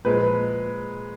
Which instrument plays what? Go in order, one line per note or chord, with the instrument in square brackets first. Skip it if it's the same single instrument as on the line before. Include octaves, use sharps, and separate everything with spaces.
[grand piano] A#2 F3 G#3 [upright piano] B4